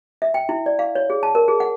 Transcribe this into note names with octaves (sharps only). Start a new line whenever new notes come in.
E5
G5
E4
D5
F5
C#5
G#4
A5
A#4
G#4
F#5